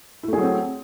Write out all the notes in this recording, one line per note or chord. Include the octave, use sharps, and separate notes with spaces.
F#3 A3 C4 E4 G#4